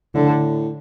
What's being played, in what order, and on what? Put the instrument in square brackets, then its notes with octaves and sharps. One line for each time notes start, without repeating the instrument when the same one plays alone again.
[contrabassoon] A2 [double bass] D3